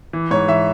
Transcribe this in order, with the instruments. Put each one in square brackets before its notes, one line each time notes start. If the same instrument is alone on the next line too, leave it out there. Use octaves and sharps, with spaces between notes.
[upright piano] E3
G#2 C#5
E3 E5